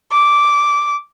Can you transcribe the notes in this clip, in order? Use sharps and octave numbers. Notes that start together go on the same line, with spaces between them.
D6